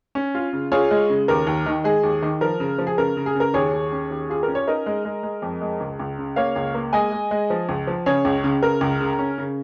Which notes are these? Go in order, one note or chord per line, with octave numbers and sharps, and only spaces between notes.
C#4
F4
C#3
F4 G#4 C#5
G#3
C#3
D#2 A#4
D#2
D#3
G#3 G#4
D#2
D#3
F3 A#4
C#3
F3
G#4
C#3 A#4
C#3
G#4
C#3 A#4
D#2 G#4 C#5
D#2
C#4
D#2
F4 G#4
C#4 A#4
C#5
D#4 A#4 D#5
G#3
G#3
G#3
F2
G#3
C#2
C#2
C#3
A#3 C#5 F5
C#2
A#3
G#3 D#5 G#5
G#3
G#3
F3
C#2
F3
C#3 G#4 C#5
C#2
C#3
C#3 A#4
C#2
C#3
C#4
C#3